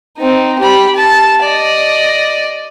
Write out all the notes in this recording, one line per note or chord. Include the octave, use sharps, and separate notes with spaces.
C4 D#4
G4 B5
A5
D5 D#5